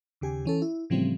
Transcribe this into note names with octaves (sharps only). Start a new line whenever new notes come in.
D#2 C#3 G4 G#5
E3 C#4 A4
E4
A2 C#3 E3 F3 G3 C4